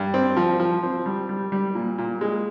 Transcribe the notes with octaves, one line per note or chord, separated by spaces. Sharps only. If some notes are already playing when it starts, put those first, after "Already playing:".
Already playing: G2
C4
F3
F3
C4
G3
G3
G3
A#2
A#2
G#3